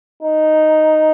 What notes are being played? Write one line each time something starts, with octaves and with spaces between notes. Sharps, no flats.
D#4